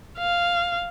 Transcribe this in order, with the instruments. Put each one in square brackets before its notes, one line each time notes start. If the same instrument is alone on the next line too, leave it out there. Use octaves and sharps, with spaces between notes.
[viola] F5